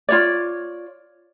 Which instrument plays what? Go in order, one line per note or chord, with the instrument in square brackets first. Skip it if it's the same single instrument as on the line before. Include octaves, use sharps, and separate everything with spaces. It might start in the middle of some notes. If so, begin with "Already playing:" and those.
[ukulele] F4 C#5 D5